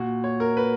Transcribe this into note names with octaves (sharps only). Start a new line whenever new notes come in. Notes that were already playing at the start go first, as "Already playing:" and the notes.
Already playing: A#2 F#4
C#5
A#4
B4